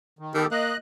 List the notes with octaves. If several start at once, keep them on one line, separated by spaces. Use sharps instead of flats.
D#3
D#3 B3 G4 A4
A#3 D#5 F#6